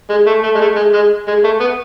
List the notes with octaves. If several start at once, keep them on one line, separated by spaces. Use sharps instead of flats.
G#3
A3
A3
G#3
A3
G#3
G#3
G#3
A3
B3